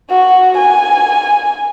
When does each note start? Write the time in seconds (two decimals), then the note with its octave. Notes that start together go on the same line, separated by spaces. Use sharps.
0.11 F#4
0.58 G#5